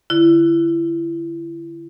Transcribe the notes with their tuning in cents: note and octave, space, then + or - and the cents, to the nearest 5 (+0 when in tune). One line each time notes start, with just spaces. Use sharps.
D3 +10 E4 +30